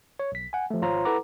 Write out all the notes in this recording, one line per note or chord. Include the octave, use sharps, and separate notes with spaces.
C#5
B1 B6
F#5 G#5
F3 A3
G#1 F4 C5 C#5 A#5
E4 A4 B4 F#5 A#5 D6